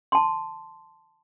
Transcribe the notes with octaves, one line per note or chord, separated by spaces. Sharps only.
A5 C6